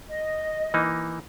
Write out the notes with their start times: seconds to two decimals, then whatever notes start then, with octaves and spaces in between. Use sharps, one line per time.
0.10 D#5
0.74 E3 A#3 D#4